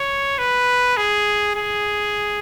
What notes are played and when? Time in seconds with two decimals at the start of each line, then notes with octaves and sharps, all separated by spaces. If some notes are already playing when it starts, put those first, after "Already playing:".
Already playing: C#5
0.39 B4
0.97 G#4
1.56 G#4